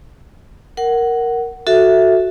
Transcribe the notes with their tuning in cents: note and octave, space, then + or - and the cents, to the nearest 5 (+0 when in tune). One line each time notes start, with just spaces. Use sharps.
A#4 +0 F#5 +15
F#4 +0 A4 +0 E5 +0